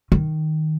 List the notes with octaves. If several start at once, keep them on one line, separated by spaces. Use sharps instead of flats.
D#3